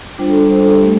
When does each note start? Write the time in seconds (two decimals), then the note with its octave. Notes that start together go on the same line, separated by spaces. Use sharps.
0.18 G3 D4 F4 C5
0.29 A4
0.51 C5
0.62 A4
0.73 G4
0.83 A3